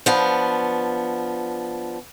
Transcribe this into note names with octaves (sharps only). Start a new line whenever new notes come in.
F3 B3 D4